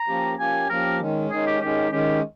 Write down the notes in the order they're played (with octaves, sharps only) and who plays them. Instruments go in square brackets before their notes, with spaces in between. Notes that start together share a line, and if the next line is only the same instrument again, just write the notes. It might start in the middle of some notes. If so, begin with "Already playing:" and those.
Already playing: [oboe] A#5
[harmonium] F3 A#3 C#4 G4
[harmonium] F3 A#3 C#4 G4 [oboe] G#5
[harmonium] F3 A#3 C#4 G4 [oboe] A#4
[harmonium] D#3 G#3 C#4
[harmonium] D#3 G#3 C#4 [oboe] G#4
[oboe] G4
[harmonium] D#3 G#3 C#4 [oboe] G4
[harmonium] D#3 G#3 C#4 [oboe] G4